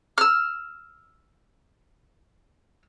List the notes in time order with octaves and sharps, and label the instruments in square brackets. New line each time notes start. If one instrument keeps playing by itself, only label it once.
[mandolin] E6 F6